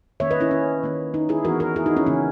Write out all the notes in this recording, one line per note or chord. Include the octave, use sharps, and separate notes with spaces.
D#3 A#3 C#4 C#5 E5
B4 D#5
C#4 E4
C#4
D#3 A#3 C#4
D#4
E4 G#4
E3 B3 F#4 A#4
F#4 A#4
E4 G#4
D#4 F#4
C#4 E4
C#3 E3 A#3 C#4